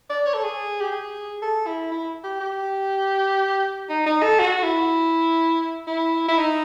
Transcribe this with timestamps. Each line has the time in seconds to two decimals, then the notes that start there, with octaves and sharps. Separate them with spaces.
0.10 D5
0.26 C#5
0.34 A4
0.43 G#4
0.81 G4
0.92 G#4
1.42 A4
1.67 E4
1.92 E4
2.24 G4
2.40 G4
3.90 D#4
4.06 D#4
4.23 A4
4.39 F#4
4.63 E4
5.87 E4
6.28 E4
6.37 D#4